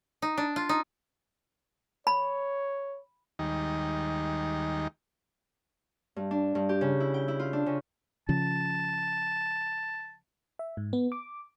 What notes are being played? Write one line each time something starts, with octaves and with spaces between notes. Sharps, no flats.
D#4
D4
F4
D#4
C#5 B5
D#2 D#3 G3 G#3 D#4
G2
D4
G2
G4
C#3
E4
G5
E4
F4
D4
C#3
C#3 F3 A5
E5
G#2
B3
D6